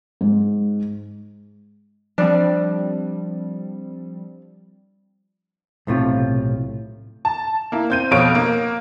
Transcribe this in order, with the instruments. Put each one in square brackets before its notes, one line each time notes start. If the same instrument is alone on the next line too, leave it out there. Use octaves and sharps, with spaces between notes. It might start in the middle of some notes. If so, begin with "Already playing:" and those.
[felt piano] G#2
[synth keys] F3 G3 C4 [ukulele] D4
[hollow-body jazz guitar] B1 A2 C3 F4
[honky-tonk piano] A5
A#3 E4
C4 G6 D#7
F2 B2 C#5 F5 D7
A#3